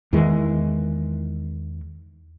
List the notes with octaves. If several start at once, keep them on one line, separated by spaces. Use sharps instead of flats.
E2 D#3 E3 G#3